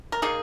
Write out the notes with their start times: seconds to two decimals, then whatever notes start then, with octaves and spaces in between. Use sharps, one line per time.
0.12 A#4
0.22 D#3 A#3 D#4 G#4